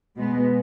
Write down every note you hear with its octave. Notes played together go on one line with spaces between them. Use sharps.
B2 G#3 B3